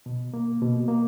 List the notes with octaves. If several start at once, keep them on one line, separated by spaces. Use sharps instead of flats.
B2
A#3
B2
A#3